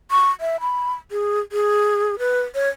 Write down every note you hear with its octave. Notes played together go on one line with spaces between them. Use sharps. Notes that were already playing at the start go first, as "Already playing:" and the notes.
C#6
E5
B5
G#4
G#4
B4
C#5